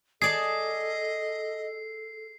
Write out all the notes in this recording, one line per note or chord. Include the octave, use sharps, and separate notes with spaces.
G#4 A4 D5 D#5 A5 C7